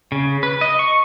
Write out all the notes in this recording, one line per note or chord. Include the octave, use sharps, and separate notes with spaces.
C#3
B4
D#5
C#6